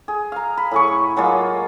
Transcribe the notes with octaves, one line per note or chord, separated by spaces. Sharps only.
G#4
F5 A#5
B5
A2 G#4 C#6
F#3 G#3 A#3 F4